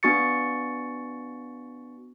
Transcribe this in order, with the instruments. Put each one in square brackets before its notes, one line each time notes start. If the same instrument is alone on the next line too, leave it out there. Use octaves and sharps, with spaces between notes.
[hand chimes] B3 D4 F#4 C#6 A6 C#7